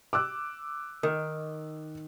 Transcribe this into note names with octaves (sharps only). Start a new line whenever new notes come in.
D6 E6 F#6
D#3